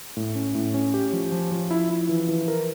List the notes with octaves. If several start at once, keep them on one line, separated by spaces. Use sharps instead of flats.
A2
C#4
A2
C#4
G4
F3
F3
F3
E4
E4
E3
E3
A#4